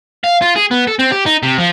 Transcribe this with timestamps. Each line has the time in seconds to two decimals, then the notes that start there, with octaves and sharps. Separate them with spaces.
0.24 F5
0.42 F4
0.56 G#4
0.71 B3
0.88 A4
0.99 C4
1.12 G4
1.26 D#4
1.43 C3
1.58 F3